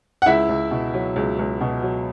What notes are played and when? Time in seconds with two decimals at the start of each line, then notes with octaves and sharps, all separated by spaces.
0.22 F#5
0.26 C#2 E4 E5
0.49 C#2
0.71 B2
0.94 F#3
1.16 C#2
1.39 C#2
1.61 B2
1.83 F#3